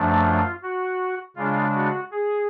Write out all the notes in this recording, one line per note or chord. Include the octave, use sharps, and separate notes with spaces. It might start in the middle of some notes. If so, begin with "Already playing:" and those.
Already playing: F#2 F3 A3 D4
F4
F#4
C#3 G#3 D4 F4
F#4
G#4